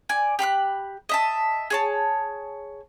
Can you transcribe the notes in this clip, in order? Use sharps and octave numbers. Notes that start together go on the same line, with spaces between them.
D5 G#5
G4 B5 C6 F#6
D#5 E5 A5
G#4 C#5 A5